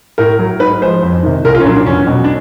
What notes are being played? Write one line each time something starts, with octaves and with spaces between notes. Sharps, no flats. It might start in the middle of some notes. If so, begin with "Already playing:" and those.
A2 A#4
F#3
G#2 B4
F3 G#3 C5
F2
C3 D#3
C2 A#4
F4
C#4
A#2 F#3 D4
D4
E2 C#4
B2 F#3
D4